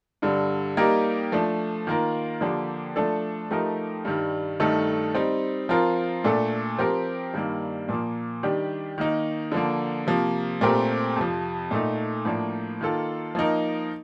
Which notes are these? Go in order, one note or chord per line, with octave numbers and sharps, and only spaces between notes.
G2 D3 G3
G3 A#3 D#4 G4 A#4
F3 A3 D4
D#3 A#3 F4 A#4
D3 F3 A#3 D4 G4
F3 A3 D4 A4
F3 A3 D#4 G4 A#4
G2 D#3 G3
G2 D#3 A3 D#4 A4
G3 C4 D#4
F3 C4 F4 A#4
A#2 A3 D4 A4
F3 C4 G4 A#4
G2 D#3 G3 A#3
A#2 F3 A#3
D#3 G3 D4 G4
D#3 A#3 D#4
D3 F3 A#3
C3 F3 A#3
A#2 A3 C4 G4 A#4
F2 C3 F3
A#2 A3 D#4
A2 F3 A#3 D4
D#3 A#3 F4 A4
F3 A#3 D#4 A#4